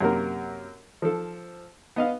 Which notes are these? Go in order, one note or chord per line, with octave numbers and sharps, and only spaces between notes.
F#2 C3 A#3 A#4
F3 A4
B3 D#5 F5